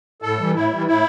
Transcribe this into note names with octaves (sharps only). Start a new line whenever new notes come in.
A2 A4
E3 G3
A2 E4
E3 G3
A2 E4